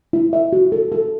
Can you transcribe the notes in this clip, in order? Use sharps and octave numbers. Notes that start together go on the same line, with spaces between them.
E4
E5
F#4
A4
A4